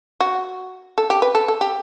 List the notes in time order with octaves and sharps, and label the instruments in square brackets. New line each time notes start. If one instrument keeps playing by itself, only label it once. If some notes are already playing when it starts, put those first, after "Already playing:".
[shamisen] F#4
A4
G4
B4
A4
A4
G4